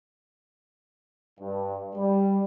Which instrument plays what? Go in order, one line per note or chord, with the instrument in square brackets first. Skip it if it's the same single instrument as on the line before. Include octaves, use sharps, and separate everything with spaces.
[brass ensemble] G2
G3